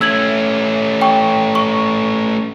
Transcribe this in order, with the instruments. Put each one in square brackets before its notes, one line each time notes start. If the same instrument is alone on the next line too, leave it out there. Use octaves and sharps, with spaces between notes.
[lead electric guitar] A3 C#4 [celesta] E6 G#6 F#7
[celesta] G5 C#6
C#6